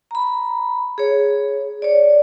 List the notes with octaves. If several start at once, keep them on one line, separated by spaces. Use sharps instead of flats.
A#5 B5
G#4 C#5
C#5 D5